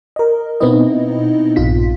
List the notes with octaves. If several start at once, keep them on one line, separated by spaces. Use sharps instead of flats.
A#4 D#5
B2 B3 C4 D#4 E4 D#5
A#1 G2 F4 B6